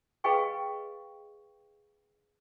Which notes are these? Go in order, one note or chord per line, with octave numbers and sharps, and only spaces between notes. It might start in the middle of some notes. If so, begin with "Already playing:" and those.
G#4 B4 D#5 F5 G5 C#6